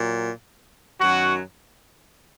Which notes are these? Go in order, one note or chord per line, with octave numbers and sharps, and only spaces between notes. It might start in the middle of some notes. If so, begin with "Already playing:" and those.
Already playing: A#2 F#3
F#2 D#3 F#3 F#4